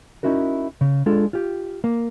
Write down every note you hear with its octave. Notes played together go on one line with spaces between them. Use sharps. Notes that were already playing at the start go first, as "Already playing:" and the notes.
C#4 D#4 E4 F#4 A#4
C#3
G#3 D4 F4 A4
F4 G4
A#3